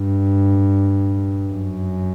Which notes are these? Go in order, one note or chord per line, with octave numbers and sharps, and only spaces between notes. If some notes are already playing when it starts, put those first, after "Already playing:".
Already playing: G2
F#2